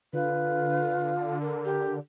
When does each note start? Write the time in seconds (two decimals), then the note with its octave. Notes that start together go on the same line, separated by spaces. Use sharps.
0.13 D3 F4 B4
1.41 A#4
1.65 G4